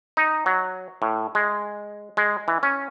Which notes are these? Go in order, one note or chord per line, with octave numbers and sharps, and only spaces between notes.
D#4
F#3
A2
G#3
G#3
E3
C#4